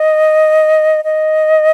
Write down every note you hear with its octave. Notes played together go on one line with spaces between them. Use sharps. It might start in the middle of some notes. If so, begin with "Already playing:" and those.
Already playing: D#5
D#5